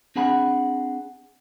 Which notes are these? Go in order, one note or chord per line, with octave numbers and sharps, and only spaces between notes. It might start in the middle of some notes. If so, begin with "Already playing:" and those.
C4 D4 G#4 F#5 G#5 B5